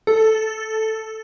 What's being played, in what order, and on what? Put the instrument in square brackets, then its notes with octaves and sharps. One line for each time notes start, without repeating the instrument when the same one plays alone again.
[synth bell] A4